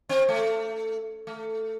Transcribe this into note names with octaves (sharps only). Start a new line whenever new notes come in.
C4
A3
A3